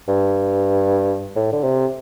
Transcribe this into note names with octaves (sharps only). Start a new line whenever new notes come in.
G2
A2
D3
C3